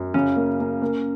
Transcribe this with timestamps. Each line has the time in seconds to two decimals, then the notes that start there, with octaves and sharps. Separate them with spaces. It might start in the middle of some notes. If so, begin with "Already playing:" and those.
Already playing: F#2
0.14 C#3 C#4
0.36 A#3
0.60 A#3
0.82 A#3